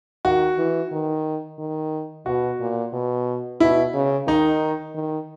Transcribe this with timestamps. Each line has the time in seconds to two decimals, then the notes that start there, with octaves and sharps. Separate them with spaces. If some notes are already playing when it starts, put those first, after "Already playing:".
0.25 D#3 F#4
0.58 E3
0.92 D#3
1.59 D#3
2.26 B2 F#4
2.60 A#2
2.93 B2
3.60 B2 E4
3.94 C#3
4.27 D#3 D#4
4.95 D#3